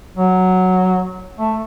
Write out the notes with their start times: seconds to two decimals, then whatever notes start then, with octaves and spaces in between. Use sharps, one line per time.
0.17 F#3
1.38 A3